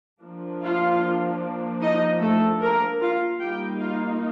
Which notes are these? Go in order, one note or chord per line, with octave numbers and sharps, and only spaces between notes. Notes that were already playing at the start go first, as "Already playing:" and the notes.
F3 A#3 D4
F4 F5
D#4 D#5
A3 A4
A#3 A#4
F4 F5
G3 A#3 D#4 G4 G5
F4 F5